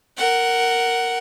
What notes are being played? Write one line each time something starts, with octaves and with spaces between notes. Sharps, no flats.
A#4 F#5